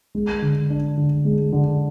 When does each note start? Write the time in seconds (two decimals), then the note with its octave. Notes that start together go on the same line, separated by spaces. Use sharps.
0.15 G#3
0.42 D3
0.70 D4
0.97 D3
1.25 G#3
1.52 D3